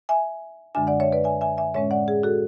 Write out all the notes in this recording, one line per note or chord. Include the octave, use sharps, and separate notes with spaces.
E5 G#5
F#2 D3 G#3 D4 E5 G#5
D5 F#5
C#5 E5
B4 D5
E5 G#5
E5 G#5
E5 G#5
A2 G#3 C#4 C#5 E5
D5 F#5
G#4
F#4 A4